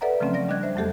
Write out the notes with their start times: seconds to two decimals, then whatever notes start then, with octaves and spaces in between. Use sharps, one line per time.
0.01 A4 B4 D5 E5 F#5 A#5
0.20 C#3 F3 F#3 A3 C4 C#4
0.34 F#3 D5 A#6
0.48 G3 D4 D#5 F#6 G#6
0.63 C5 E5
0.76 F2 F#3 A3 G4 A4